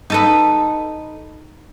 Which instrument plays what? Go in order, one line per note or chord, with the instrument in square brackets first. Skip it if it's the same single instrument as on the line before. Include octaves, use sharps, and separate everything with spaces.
[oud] D#4 A4 B4